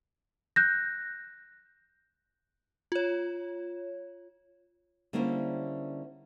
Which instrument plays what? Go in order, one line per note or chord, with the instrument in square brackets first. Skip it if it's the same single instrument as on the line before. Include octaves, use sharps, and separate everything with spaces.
[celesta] F#6 G6 A#6
[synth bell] F4 C#5
[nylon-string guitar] D3 G3 A#3 C#4 E4 C5